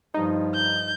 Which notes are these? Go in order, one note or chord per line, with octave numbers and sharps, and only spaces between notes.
G2 F3 D#4
G6